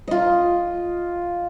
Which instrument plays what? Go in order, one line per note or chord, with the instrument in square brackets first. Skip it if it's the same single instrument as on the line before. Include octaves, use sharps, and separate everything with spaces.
[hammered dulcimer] F4 D#5